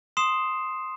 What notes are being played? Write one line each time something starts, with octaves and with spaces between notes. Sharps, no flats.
C6 D#6 C7 E7